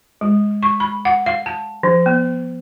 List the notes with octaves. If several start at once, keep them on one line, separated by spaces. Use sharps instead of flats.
G#3
C#6
B5
F#5
F5
A5
F3
B3